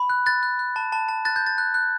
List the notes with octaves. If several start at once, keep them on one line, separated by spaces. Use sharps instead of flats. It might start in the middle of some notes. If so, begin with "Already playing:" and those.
Already playing: B5
F#6
F#6 A6
F#6
F#6
A5
A5
A5
F#6 A6
G6
F#6
A6
F#6
F#6